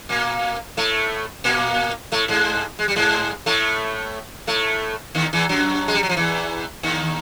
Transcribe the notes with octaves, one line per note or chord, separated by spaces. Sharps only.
A#2 A#3
A2 A3
A#2 A#3
A2 A3
G#2 G#3
G#3
G3
G#2 G#3
A2 A3
A2 A3
D#2 D#3
E2 E3
F#2 F#3
G#3
G3
F#3
F3
E2 E3
D#2 D#3